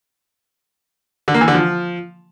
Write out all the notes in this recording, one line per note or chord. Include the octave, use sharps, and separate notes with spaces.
D3
A#3
E3
D3
F3